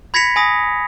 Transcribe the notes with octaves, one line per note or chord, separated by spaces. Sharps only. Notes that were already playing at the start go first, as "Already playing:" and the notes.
B5 G#6 A#6 B6 C#7 F7
G#5 B5 D#6 A#6